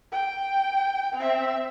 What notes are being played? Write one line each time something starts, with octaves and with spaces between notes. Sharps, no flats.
G5
C4 E5